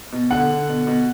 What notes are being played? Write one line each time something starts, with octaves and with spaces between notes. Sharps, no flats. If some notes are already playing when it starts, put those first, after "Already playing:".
B2
D3 F#5
D3
B2
B2